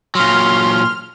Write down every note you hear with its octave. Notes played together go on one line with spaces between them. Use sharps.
A#2 F#3 C6 F6